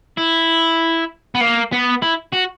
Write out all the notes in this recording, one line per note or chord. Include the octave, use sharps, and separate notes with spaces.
E4
B3
A#3
B3
E4
F#4